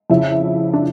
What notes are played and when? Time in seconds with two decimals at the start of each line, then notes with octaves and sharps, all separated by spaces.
0.10 F2 C#3 F3 E4
0.73 D4